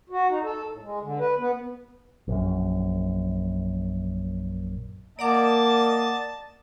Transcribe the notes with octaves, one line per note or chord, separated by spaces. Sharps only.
F#4
D#4
A4
A2
G#3
D3
B4
B3
A#1 F#2
A#3 D5 D#5 F#5 A5 D6